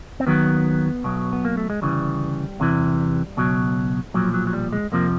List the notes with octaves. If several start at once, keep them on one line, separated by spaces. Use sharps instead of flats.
C4
D#2 D#3 F#3 B3
B1 B2 F#3
B3
A#3
A3
G#3
D2 C#3 E3 G3
E2 C3 E3
C#2 B2 F#3
B1 A#2 F3 F#3
F#3
F#3
G3
G#3
F2 C3 F3 A#3